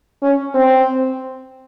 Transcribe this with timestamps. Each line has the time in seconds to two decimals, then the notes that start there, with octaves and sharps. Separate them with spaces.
0.22 C#4
0.54 C4